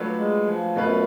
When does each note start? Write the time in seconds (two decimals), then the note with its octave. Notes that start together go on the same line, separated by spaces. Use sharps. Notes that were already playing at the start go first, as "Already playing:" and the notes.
Already playing: F#3 A3 D4 F4 B4
0.17 G#3
0.46 F3
0.75 F#2 B2 A3 F4 B4